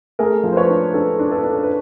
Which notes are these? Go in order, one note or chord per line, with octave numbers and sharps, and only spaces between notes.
A3 G#4 A#4
F3
C5
B4 C#5
D4
D4 A4 B4
D4
A4 B4
D4
B4